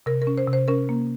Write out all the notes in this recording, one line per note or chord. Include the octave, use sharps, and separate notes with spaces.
C3 A#4
A#4
C#4
C5
C3
C5
C#4 A#4
A#3